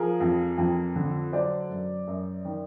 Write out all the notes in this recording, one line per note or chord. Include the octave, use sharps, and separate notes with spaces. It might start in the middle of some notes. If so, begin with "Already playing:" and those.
Already playing: F3 G#4 A#4
F2
F2
D3
F#3 C5 D5
F#2
F#2
D#3